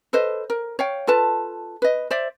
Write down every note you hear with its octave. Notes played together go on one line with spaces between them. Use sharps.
A4 B4 C5 D#5
A#4
C#5 F5 G5
F4 A4 B4 A5
B4 D#5
C5 D5 E5